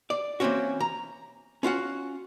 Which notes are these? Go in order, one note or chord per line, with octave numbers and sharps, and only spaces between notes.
D5
E3 A#3 C4 C#4 F#4
A#5
C#4 F4 F#4 F#5